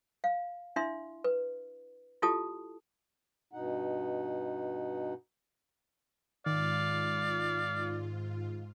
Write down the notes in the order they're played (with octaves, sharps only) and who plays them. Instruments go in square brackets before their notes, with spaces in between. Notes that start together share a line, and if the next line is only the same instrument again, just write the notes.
[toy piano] F5
D4 E4 E5 C6
B4
E4 F4 G4 A4 A5 D#6
[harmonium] G2 B2 D#4 F#5
[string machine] G#2 F4 [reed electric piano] D#3 [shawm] D5 [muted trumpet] F5